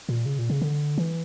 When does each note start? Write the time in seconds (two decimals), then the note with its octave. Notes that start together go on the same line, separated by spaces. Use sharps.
0.09 A#2
0.26 C#3
0.39 A#2
0.50 C#3
0.61 D3
0.98 E3